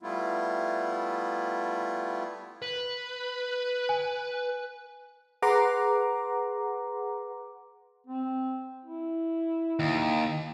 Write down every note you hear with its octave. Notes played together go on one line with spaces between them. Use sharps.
G3 A3 B3 E4 F4
B4
G#5
G#4 B4 F#5 A#5 C6 D6
C4
E4
D#2